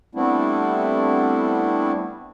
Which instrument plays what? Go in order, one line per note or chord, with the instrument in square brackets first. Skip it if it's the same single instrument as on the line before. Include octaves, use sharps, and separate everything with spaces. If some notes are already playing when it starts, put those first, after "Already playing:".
[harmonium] G3 A3 B3 C4 D4 E4